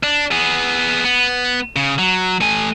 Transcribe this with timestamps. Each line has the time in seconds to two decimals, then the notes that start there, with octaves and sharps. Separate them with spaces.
0.03 D4
0.31 B3 G#4
1.05 B3
1.76 C#3
1.99 F#3
2.41 A3 G#5